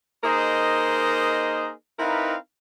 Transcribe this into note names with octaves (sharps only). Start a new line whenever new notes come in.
A#3 D#4 G#4 A#4 C5 D#5
C4 D#4 E4 A#4 B4 F5